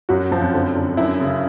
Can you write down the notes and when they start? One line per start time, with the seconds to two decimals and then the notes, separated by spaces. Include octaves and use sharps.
0.09 F#2 F#4
0.31 F#2 F3
0.42 F2
0.54 D3
0.75 D3
0.97 F#2 E4
1.20 C#3